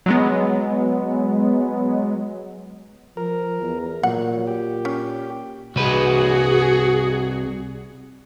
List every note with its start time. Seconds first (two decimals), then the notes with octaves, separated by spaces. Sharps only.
0.06 F#3 G#3 B3
3.17 F3 A#4
3.62 E2
4.03 A#2 F#3 F#5
4.47 G4
4.85 C#4
5.76 C2 F#4 G#4 B4